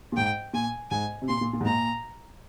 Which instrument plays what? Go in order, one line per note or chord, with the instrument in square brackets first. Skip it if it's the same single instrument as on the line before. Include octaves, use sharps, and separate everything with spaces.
[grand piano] A#2
[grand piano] G#2 [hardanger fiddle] G5
[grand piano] A#2 [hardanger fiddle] G#5
[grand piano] G#2 [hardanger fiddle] G#5
[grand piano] C3
[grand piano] A#2 [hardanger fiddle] C6
[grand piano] A#2
A#2
G#2
[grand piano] A#2 [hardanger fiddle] A#5